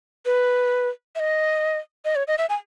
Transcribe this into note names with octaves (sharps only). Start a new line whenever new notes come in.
B4
E5
D#5
D#5
C#5
D#5
E5
G#5